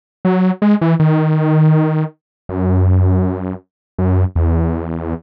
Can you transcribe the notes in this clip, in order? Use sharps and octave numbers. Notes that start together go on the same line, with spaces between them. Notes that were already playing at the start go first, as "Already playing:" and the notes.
F#3
G#3
E3
D#3
F#2
F#2
E2